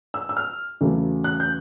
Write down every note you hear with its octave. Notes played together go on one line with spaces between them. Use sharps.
E6
E6
F6
E2 C#3 F#3 A3
F#6
G6